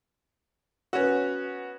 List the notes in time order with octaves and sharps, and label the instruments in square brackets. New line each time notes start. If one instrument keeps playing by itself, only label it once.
[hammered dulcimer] B3 D#5 [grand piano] C#4 F#4